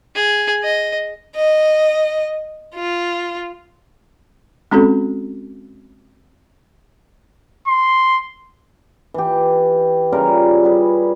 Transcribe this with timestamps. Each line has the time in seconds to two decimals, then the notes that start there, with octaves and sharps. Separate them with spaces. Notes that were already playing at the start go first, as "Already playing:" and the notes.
0.16 G#4
0.64 D#5
1.36 D#5
2.75 F4
4.71 G#3 C4 C#4 F#4 A4
7.68 C6
9.14 E3 G4
10.12 C#3 G3 F4 A#4
10.64 G3 G#4 B4